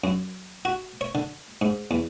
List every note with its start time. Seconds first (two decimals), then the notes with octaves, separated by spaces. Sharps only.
0.04 F#2
0.65 F#4
1.01 C#5
1.15 D3
1.62 G#2
1.91 E2